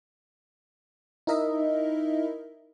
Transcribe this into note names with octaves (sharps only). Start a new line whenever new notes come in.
D#4 E4 A#4 D#5 E5